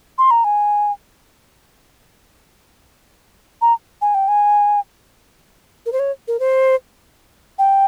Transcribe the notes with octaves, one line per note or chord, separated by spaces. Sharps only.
C6
A#5
G#5
A#5
G#5
G5
G#5
A#4
C5
C#5
A#4
C5
G5